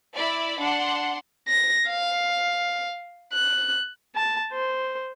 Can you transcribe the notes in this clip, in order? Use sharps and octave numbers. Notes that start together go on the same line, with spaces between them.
E4 D5 B5
D4 F#5 C6
A#6
F5
F#6
A5
C5